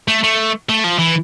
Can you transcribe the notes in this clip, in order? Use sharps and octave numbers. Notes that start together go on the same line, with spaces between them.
A3
A3
A3
F3
E3